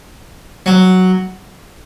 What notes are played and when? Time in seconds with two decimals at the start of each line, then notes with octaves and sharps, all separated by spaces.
0.66 F#3